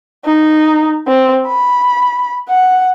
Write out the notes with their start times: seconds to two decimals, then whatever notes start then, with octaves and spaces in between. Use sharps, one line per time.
0.25 D#4
1.08 C4
1.47 B5
2.49 F#5